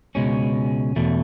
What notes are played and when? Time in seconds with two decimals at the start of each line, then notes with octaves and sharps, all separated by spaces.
0.15 C#2 B2 G#3 C#4
0.96 E2 B2 A3